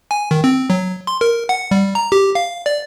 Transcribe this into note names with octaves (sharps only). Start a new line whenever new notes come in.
G#5
D#3
C4
F#3
C6
A#4
F#5
G3
A#5
G4
F5
D5